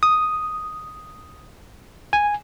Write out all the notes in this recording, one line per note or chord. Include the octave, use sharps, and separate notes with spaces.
D#6
G#5